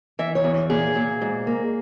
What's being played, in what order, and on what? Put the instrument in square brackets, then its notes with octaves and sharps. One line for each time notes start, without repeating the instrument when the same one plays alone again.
[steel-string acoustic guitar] E3 E5
C#5
E2
A#2 G#4
A#2
G#2
A#3